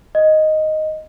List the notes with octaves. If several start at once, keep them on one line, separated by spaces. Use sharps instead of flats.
D#5